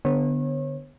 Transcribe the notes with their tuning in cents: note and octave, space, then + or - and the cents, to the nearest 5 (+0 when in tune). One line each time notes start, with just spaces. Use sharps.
D3 +0 B3 +0 C#5 -35